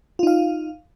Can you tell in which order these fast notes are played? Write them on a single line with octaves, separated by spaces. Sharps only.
F4 D#4 F5